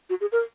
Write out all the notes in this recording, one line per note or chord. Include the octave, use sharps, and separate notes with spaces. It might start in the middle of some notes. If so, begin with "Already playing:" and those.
F#4
G#4
A#4